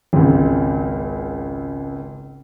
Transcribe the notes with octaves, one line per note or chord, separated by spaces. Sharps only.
G#1 C#2